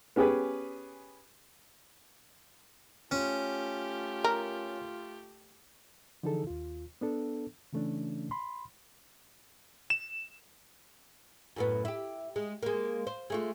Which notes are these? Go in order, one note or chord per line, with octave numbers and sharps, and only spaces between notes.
B3 C#4 G4 G#4 B4
A3 C#4 F4 G4
A#4
D3 E3 F3 D#4 G#4 A4
D#2 F4
B3 D4 A4
C#3 E3 A3 C#4 D4
B5 C6
E7
F#2 A2 B3
E4 G4
G#3
G#3 A#3
C5
G#3 A3 F4